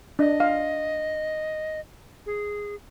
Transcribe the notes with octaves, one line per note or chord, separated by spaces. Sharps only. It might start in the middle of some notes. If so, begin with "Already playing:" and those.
D4 D#5
F5
G#4